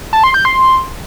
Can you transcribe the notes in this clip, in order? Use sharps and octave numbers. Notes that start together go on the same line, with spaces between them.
A5
C6
G6
C6